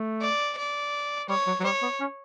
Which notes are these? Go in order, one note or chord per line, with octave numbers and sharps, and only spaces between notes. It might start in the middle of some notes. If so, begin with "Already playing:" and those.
Already playing: A3
D5
D5
G3 C#5
F#3
F#3
G3 C#5
B3
C#4